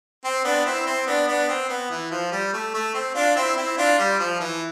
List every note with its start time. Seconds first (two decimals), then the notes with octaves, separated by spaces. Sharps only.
0.24 C4
0.45 B3 D4
0.65 C4 E4
0.87 C4
1.07 B3 D4
1.28 B3 D4
1.48 C4
1.69 B3
1.90 E3
2.11 F3
2.32 G3
2.53 A3
2.74 A3
2.94 C4
3.15 D4 F4
3.36 C4 E4
3.56 C4 E4
3.77 D4 F4
3.99 G3
4.19 F3
4.40 E3